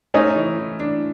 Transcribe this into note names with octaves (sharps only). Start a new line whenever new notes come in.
A3 C#4 D#4
E3
E3
D4